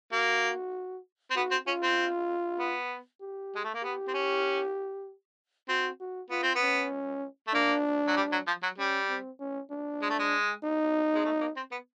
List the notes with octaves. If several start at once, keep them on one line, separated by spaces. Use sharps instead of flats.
A#3 F#4
C4
B3 F#4
C4
C#4 F4
C4
B3
G4
G#3
A3
A#3
B3 G4
C4
C#4
C4 F#4
F#4
B3 F4
C4
B3
C#4
A3
A#3 D4
F#3
G3
F#3
F3
F#3
G3 C#4
C4
C#4
D4
G#3
A3
G#3
D#4
G#3
A3
A#3
C4
B3